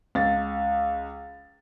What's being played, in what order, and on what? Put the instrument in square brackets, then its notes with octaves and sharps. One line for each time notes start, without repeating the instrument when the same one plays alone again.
[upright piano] C#2 A6